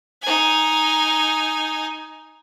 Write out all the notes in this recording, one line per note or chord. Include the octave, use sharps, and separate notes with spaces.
D#4 G#5